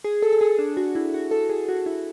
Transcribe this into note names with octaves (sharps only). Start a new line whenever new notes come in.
G#4
A4
A4
G#4
D4
F#4
E4
F#4
A4
G#4
F#4
E4